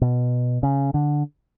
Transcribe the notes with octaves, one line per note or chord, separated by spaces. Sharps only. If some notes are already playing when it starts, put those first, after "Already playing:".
B2
C#3
D3